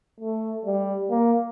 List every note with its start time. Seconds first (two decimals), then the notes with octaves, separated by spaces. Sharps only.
0.20 A3
0.65 G3
1.10 A#3